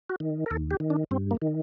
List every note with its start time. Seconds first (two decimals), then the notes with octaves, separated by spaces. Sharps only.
0.10 F#4
0.20 D#3
0.46 A#4
0.50 D#2 A4
0.71 G4
0.80 D#3
0.90 D4
1.11 G2 C4
1.31 A#3
1.42 D#3